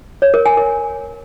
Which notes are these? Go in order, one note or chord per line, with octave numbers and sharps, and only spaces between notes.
C#5
A#4
G#5
A#4